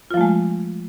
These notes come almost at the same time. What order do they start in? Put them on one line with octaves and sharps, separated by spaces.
F4 F3 A3 G#3